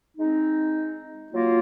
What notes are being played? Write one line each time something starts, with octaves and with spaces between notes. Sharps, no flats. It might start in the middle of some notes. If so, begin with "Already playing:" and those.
G#3 C4 D#4
F#3 A#3 F4